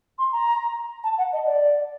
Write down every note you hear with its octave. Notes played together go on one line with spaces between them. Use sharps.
C6
A#5
A5
F#5
D#5
D5